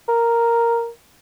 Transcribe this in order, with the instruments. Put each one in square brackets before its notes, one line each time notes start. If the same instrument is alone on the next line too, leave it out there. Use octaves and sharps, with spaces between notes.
[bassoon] A#4